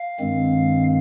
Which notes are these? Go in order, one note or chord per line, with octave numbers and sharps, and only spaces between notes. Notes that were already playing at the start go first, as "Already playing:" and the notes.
Already playing: F5
G2 D#3 G#3 C4